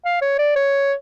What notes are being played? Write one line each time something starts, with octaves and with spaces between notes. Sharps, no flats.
F5
C#5
D5
C#5